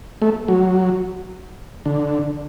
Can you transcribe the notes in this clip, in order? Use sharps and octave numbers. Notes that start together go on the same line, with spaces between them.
A3
F#3
D3